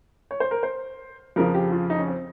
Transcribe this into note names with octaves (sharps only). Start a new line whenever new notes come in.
C#5
C5
A#4
C5
F2 C#3 F3 A#4
G4
F4
D#4
C#4
C4